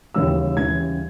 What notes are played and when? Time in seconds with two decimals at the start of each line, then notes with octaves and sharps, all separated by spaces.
0.14 D#2 C#3 E3 G3 C#4 E6
0.57 D#2 C#3 E3 G3 C#4 G#6